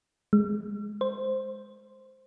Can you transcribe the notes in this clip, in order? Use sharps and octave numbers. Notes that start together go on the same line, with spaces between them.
G#3
C5